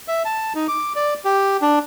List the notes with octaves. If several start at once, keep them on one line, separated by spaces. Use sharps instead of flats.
E5
A5
D#4
D6
D5
G4
D4